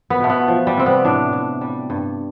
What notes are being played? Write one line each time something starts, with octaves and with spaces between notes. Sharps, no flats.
B3
B2 A3
B3
F3
G3
C3 C4
B3
A2 D4
A2
G3
G2